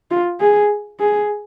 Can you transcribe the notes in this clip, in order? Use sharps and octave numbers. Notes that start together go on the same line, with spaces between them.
F4
G#4
G#4